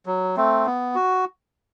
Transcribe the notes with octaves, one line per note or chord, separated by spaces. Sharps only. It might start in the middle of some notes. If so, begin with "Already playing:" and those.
F#3
A3 C4
B3
F#4